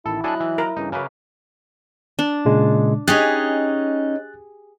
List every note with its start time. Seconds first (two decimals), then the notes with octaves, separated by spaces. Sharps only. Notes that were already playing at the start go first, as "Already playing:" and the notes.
0.06 A1 D#3 E4 A4
0.24 F#3 D4 A4 D#5 G#5 F#6
0.40 E3
0.58 A#4
0.77 G2 C#3 E3 D#4
0.92 F#2 C#3 A#4 B4 F5 D6
2.19 D4
2.45 A#2 C#3 G#3
3.08 C#4 D#4 G4 G#4 D#5 F#6 A6